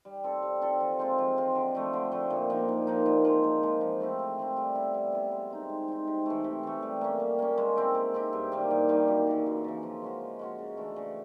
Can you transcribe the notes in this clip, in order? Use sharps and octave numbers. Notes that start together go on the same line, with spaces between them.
G3
C4 F4 A4
G3
C4 F4 A4
F3
G#3 C4 F4
F3
G#3 C4 F4
D3
F3 A3
D3
F3 A3
A#2
F3 A#3 D#4
A#2
F3 A#3 D#4
A#2
F3 G#3
A#2
F3 G#3
F3
A3 C4 E4
F3
A3 C4 E4
G3
B3 E4
G3
B3 E4
G#3
C4 D#4
G#3
C4 D#4
C3
E3 A3
C3
E3 A3
G3
A#3 C#4
G3
A#3 C#4
G#3
C4 E4 G4
G#3
C4 E4 G4
G2
D#3 G3 A#3
G2
D#3 G3 A#3
F#2
C#3 E3
F#2
C#3 E3
F3
G#3 C#4 F#4
F3
G#3 C#4 F#4
C#3
E3 A3 D4
C#3